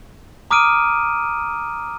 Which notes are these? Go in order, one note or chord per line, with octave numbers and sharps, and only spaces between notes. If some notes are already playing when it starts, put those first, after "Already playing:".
A#5 D6 D#6 F6 D7 D#7